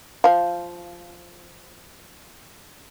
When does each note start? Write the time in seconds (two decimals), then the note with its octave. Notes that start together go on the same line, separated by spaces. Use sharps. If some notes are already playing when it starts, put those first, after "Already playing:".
0.24 F3 F5